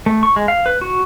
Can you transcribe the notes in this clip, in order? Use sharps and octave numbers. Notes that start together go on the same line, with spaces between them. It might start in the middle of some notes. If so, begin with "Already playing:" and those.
A3
C#6
G#3
F5
B4
F#4